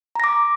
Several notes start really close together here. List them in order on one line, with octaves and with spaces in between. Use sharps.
A#5 A#6 D6